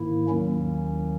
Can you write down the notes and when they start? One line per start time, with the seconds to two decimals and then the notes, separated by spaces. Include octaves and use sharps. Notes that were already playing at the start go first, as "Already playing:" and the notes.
Already playing: G#2 D#3 A#3 E4
0.28 D#2 D#3 F#3 A#3 C#4